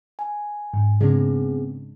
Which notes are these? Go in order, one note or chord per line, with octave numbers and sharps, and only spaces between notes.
G#5
G#2
C#3 G#3 B3 C4 D4 G#4